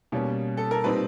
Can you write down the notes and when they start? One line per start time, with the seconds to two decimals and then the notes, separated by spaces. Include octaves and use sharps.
0.12 B2 G3 A#3 C#4
0.57 A4
0.71 A#4
0.84 A#2 G3 C4 D#4 B4